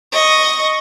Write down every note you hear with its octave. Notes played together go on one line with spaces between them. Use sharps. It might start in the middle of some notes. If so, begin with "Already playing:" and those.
D#5 C#6